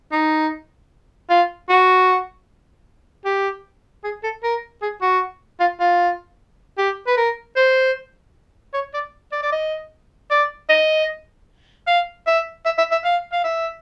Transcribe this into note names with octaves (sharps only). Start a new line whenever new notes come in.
D#4
F4
F#4
G4
G#4
A4
A#4
G#4
F#4
F4
F4
G4
B4
A#4
C5
C#5
D5
D5
D5
D#5
D5
D#5
F5
E5
E5
E5
E5
F5
F5
E5